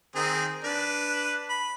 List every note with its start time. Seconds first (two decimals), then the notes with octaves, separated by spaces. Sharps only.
0.15 D#3 C4 G#4
0.64 D4 B4
1.50 B5